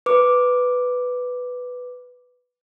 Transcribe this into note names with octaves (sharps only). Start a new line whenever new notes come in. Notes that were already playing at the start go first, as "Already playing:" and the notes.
B4 D6